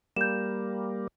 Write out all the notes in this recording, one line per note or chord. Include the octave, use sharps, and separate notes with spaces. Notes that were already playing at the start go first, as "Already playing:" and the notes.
G3 A#3 G6 E7